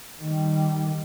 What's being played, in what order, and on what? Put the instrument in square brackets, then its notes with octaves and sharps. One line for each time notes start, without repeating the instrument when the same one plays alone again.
[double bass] D#3 G3